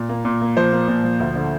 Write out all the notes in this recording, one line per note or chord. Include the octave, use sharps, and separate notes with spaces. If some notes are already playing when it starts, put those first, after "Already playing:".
Already playing: A#2
A#3
A#2
A#3
F3 C5
A#3
A#2
F3
D2
D3